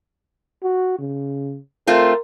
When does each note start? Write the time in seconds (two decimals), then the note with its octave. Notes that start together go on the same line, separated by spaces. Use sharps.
0.63 F#4
0.99 C#3
1.87 A3 C4 F4 A#4